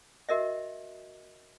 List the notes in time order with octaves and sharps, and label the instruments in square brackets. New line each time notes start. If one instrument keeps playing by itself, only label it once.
[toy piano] F#4 A#4 D#5 E5